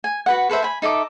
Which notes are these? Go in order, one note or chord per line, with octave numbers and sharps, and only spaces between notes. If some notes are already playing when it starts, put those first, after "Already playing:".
G#5
F#4 B4 F#5
A4 B4 C5 E5
G#5 B5
D#4 A4 E5 D6